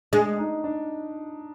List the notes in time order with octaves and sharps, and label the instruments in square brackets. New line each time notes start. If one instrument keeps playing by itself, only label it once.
[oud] G#3 [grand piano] D4
[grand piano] D#4
D4